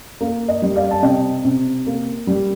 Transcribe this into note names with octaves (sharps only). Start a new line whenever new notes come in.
A#3
D#5
G3
D5 F5
A5
C3 D#5 G5
C3
A#3
G3